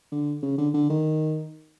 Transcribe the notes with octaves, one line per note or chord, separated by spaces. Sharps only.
D3
C#3
D3
D3
D#3